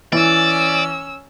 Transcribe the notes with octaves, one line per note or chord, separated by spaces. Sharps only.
E3 C#4 D5 E6